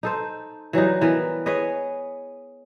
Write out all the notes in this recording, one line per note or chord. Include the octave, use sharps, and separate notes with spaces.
D#4 A4 C5
E3 F#3 G3 D#4
E3 B3 A#4
G#4 B4 C#5 D#5